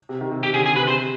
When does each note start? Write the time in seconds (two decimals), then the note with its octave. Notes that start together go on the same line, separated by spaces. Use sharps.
0.09 C3
0.21 D#3
0.31 C3
0.43 C3 G4
0.54 D3 G#4
0.65 C3 G#4
0.76 C3 B4
0.88 C3 C5